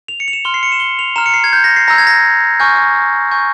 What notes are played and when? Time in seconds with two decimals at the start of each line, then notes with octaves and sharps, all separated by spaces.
0.08 F7
0.20 C#7
0.28 F7
0.33 E7
0.45 C6 F6 G7
0.54 C7
0.63 C#7
0.72 E7
0.80 G7
0.99 F7
1.16 A#5 F6 E7
1.26 C#7
1.34 C7
1.44 G#6
1.53 G6
1.64 A#6
1.76 C7
1.88 A#5 E6 G6 A#6
1.98 G#6
2.07 A#6
2.60 G#5 C#6 F6 G6
3.31 G#5 C#6 G6